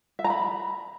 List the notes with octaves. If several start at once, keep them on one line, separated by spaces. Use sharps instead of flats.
E5
A#5
B5